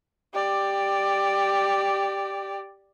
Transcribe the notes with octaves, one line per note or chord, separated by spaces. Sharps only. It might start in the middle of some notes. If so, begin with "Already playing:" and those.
G4 D5